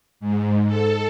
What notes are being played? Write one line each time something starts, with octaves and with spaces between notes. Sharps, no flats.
G#2
A4